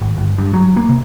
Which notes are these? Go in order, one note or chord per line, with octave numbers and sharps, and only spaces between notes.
G#1
G1
G2
F#3
A#3
C3